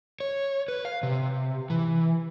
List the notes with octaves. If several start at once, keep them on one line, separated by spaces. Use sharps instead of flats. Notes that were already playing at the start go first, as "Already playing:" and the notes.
C#5
B4
F5
C3
E3